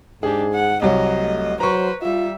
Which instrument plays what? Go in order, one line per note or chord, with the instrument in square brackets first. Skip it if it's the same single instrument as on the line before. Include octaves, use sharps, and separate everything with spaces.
[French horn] G#2 [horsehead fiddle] D4 G4 [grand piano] G#4
[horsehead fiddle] F#5
[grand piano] C2 F#3 [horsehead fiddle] D#5
[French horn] A3
[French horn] F#3 [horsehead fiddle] B4 C5 [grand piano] A#5 C#6
[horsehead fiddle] G3 E5 [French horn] F4